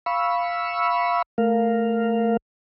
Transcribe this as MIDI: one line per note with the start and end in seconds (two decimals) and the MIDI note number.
0.06 1.22 77
0.06 1.22 83
0.06 1.22 85
0.06 1.22 88
1.38 2.37 57
1.38 2.37 70
1.38 2.37 77